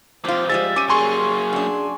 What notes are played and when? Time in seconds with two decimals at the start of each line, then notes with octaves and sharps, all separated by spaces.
0.25 F2 A#2 F4 G4 C5
0.50 F3 G3 G#3 E5 A6
0.76 G3 C#4 D6 D#7
0.89 F#3 A#3 G#4 G#5 C6 C#6
1.53 F#2 D4